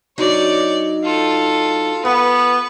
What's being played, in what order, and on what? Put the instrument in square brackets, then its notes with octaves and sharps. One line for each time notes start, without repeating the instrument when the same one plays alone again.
[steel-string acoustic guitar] F#3 D4 D#4 [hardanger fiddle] C#5 D5
[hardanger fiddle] F4 A4
[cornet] B3 [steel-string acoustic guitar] F4 [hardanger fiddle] B4